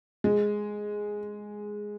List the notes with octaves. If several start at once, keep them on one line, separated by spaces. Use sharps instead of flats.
G#3